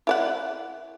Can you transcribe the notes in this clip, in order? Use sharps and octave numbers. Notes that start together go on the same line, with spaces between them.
E4 D5 F#5